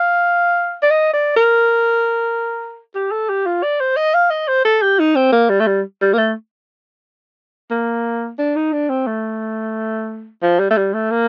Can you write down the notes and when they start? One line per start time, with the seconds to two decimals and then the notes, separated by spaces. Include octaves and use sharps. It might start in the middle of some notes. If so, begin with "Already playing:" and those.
Already playing: F5
0.83 D5
0.91 D#5
1.13 D5
1.37 A#4
2.95 G4
3.12 A4
3.29 G4
3.46 F4
3.63 D5
3.80 C5
3.97 D#5
4.14 F5
4.31 D#5
4.48 C5
4.65 A4
4.82 G4
4.99 D#4
5.16 C4
5.32 A#3
5.49 G3
5.60 A3
5.67 G3
6.02 G3
6.13 A#3
6.18 A3
7.71 A#3
8.39 D4
8.56 D#4
8.73 D4
8.90 C4
9.07 A3
10.43 F3
10.60 G3
10.71 A3
10.77 G3
10.94 A3
11.11 A#3